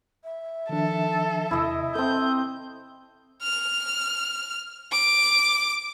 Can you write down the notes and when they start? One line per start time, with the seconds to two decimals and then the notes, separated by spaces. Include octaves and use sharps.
0.24 E5
0.69 D#3 F3 D4 A4
1.51 E2 C3 E4 D#5 E6
1.95 C4 A4 D#5 A5 G6
3.43 F6
4.92 D6